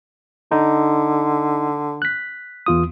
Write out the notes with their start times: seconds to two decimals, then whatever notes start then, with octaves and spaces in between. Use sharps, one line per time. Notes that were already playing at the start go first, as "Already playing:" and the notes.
0.52 D3 D#4
2.02 F#6 B6
2.66 E2 F4 D#6